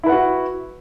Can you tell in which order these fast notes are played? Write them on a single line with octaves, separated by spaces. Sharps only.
E4 B4 F#5 F#4